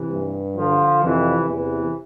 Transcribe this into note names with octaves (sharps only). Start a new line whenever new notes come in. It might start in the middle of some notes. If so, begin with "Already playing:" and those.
Already playing: C3 E3
G2
D3 F3
F2 C3 E3
E2 C3 E3